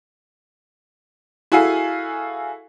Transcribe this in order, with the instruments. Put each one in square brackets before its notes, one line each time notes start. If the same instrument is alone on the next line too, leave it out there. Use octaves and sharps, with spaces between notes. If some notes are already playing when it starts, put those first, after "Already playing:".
[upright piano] E4 F#4 G#4 A4 F5 G#5